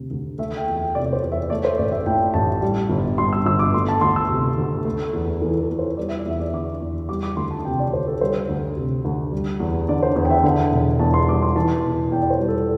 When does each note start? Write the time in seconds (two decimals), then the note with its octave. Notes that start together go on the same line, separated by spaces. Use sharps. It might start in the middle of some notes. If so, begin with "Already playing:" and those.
Already playing: D2 C3
0.11 D2
0.38 A3 E5
0.57 G5
0.67 E2
0.76 G5
0.95 C3 D5
1.06 D5
1.13 C5
1.23 E2
1.32 E5
1.50 A3 D5
1.65 C5
1.78 A1 D5
1.92 E5
2.06 A2 G5
2.34 A1 A5
2.62 G3
2.90 G1
3.18 G2 C6
3.33 E6
3.46 G1 E6
3.59 D6
3.74 A3 C6
3.88 A5
4.01 D2 C6
4.16 E6
4.29 C3
4.58 D2
4.85 A3
5.13 E2
5.41 E3 A4
5.60 A4
5.70 E2
5.79 C5
5.97 G3 D5
6.09 E5
6.19 D5
6.26 E2 E5
6.40 D5
6.53 D3 D6
6.82 E2
7.09 G3 D6
7.23 D6
7.37 D2 C6
7.51 A5
7.65 C3 G5
7.79 D5
7.93 D2 C5
8.07 A4
8.21 G3 C5
8.49 D2
8.77 C3
9.05 D2
9.32 G3
9.60 E2
9.89 D3 D5
10.03 C5
10.16 E2
10.25 G5
10.30 E5
10.44 D3
10.72 E1
10.99 E2 A5
11.14 C6
11.28 G3 D6
11.42 C6
11.55 E3 A5
11.84 E1
12.12 E2 G5
12.21 D5
12.31 C5
12.39 G3
12.48 A4